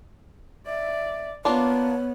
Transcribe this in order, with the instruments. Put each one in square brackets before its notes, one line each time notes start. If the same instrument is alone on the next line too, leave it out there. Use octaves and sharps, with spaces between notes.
[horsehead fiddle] D5 [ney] E5
[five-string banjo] A#3 D4 F4 [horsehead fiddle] B3 [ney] C#5